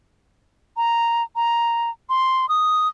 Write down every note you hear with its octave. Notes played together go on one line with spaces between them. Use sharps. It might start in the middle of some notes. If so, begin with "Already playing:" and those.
A#5
A#5
C6
D#6